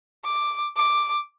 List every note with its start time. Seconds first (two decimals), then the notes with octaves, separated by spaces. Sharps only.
0.24 D6
0.76 D6